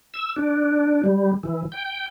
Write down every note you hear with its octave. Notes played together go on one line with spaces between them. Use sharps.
E6
D4
G3
E3
G5